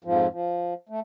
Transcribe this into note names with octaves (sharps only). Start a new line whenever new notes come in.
F2 G#2 F3
F3
A3